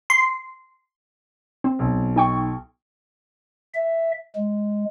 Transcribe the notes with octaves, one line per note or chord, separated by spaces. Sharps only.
C6
C4
B1
D#4 G5 C#6
E5
G#3